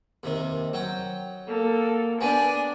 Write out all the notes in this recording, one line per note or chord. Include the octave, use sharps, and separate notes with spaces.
D#2 C3 D#3
F#3 G5 D#6
A#3 A4
B3 D4 G4 D5 G#5